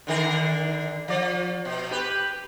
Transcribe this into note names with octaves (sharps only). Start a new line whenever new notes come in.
D3 D#3 A#4
F3 D5
B2
G4 B4